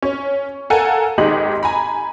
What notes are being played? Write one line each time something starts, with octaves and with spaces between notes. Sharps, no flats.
C#4
A4 A#4 F5 F#5 G#5
G#1 G#2 G#3 G4 D#5 F#7
G#5 A#5 B5